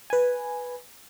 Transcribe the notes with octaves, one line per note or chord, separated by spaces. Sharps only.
B4 G#5